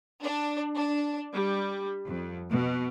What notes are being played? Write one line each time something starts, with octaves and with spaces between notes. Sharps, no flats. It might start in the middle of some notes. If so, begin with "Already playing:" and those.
D4
D4
G3
F2
B2